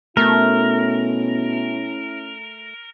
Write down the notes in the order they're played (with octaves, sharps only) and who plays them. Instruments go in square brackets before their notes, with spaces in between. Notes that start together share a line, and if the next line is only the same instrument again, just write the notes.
[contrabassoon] B2 [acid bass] A3 [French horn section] C#4 E4 [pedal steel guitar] A#4